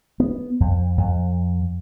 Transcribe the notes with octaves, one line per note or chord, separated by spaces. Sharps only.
B3
F2
F2